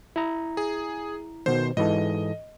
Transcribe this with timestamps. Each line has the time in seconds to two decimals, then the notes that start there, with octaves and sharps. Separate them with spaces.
0.16 E4 A#5
0.57 G#4
1.46 B2 D#3 C5
1.77 G#2 E3 A4 D#5